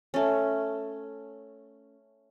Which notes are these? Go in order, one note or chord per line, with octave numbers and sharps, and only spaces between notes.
A3 C#4